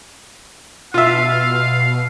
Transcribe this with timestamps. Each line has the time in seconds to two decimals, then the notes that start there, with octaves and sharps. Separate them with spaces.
0.94 B2 F4 E5 F5